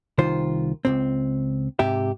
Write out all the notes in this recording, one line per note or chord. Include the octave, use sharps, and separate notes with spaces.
C2 D#3 F4 C5
C#2 G#2 C4
G#2 C3 G4 E5